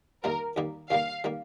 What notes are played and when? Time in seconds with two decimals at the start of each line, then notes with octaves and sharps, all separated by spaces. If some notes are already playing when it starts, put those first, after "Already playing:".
0.23 D#2 D#3 G3 A#3 A#4
0.56 D#2 D#3 G3 A#3
0.90 D#2 D#3 G3 A#3 F5
1.24 D#3 G3 A#3